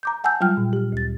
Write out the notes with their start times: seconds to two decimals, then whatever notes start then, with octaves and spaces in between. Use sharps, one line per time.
0.03 A#5 D6 G6
0.24 F#5 G#5 A5 E6 G6
0.41 F#3 G3 F4 G5 F6
0.57 A#2
0.73 G4 F6
0.92 D2 A6